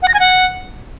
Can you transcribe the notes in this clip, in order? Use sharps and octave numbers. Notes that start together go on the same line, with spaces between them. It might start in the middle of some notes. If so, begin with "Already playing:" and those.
F#5
A#6
G#5
F#5